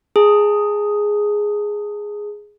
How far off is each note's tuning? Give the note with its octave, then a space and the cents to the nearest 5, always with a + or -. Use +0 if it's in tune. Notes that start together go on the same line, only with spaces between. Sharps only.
G#4 +0 A5 +35